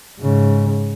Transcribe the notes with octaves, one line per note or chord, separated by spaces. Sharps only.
G#2 C#3